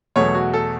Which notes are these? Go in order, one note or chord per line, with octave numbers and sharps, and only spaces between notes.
E2 B2 F#3 A3 C#5
F#4
A4